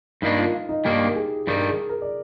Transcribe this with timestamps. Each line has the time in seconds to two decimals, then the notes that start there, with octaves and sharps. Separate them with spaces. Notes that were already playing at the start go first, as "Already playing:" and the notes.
0.22 G2 D#3 A#3 D4 D#4 D#5
0.38 F4 F5
0.53 F4 F5
0.69 D#4 D#5
0.85 G2 D#3 A#3 D4 G4 G5
1.16 G#4
1.47 G2 D#3 G3 A#4
1.69 G#4
1.89 A#4
2.02 D5